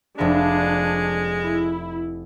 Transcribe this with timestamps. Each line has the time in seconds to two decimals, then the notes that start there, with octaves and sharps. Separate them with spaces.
0.18 F1 F3 G#3 D4 B5
1.42 E4